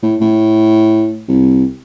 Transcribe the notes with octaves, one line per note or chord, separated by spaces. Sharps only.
A2
A2
C2